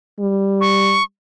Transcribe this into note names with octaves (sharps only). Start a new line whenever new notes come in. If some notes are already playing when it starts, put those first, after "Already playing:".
G3
C#6